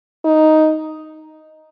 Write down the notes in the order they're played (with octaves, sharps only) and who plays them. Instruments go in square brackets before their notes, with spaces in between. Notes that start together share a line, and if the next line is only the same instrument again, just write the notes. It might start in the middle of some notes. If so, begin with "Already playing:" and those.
[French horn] D#4